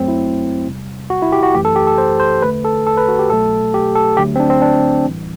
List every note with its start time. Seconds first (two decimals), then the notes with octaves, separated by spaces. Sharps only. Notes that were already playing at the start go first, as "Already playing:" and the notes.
Already playing: F#2 F#3 A3 C4
0.08 E4
0.67 E2 C3 G3
1.10 F#4
1.22 E4
1.32 G4
1.43 F#4
1.55 F#2 E3 A3 G4
1.65 A4
1.76 G4
1.87 A4
1.98 C5
2.20 C5
2.42 E2 D3 A3 B4
2.65 A4
2.86 A4
2.98 B4
3.09 F#4
3.19 G4
3.29 C2 B2 F#3 A3 A4
3.74 G4
3.95 A4
4.17 D2 D3 F#3 A3 G4
4.36 C4
4.40 D4
4.50 C4
4.62 D4
5.05 A2 E3 G3